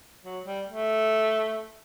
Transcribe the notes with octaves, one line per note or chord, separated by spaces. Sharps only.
F#3
G3
A3